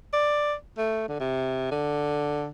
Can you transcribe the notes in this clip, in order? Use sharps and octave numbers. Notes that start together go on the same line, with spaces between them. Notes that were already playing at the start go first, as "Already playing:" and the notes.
D5
A3
D3
C3
D3